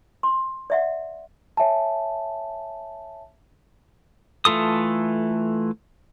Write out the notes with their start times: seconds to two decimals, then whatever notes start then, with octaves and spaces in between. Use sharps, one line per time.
0.23 C6
0.70 D5 E5 F#5
1.57 C#5 E5 G#5 A5
4.45 E3 A3 F4 A4 D#6